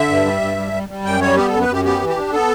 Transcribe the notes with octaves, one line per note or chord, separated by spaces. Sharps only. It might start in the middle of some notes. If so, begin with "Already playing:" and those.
Already playing: D3 E5
G2
G3
G2
G3
G3
G3
F#2 G5
G3 C#5
B3 G4
F#2 A4
B4
F#2 G4
B3 G4
E3
G4
D4
B3 A4